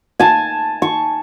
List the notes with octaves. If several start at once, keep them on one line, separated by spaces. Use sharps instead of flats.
G#5 A5
C#6